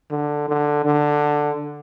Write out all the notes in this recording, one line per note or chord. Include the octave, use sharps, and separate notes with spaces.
D3
D3
D3